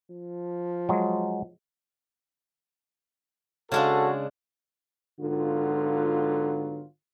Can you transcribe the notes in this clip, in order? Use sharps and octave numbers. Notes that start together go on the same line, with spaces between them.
F3
F#3 G#3
C#3 G#3 D4 F#4 A4
G#2 D3 F#3 B3 F4